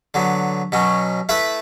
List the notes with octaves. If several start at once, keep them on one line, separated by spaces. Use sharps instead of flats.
D3 F#3 B3
B2 F#3 C#4
A3 E4 B4 E5